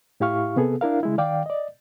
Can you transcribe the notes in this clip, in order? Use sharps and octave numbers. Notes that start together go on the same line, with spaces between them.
A2 E4 G4 F5 C#6 F6
C3 B3 G#4 A4
D4 E4 A#4 F5
C#3 G#3 E4
D#3 D5 F5 G5 D6
D5 D#5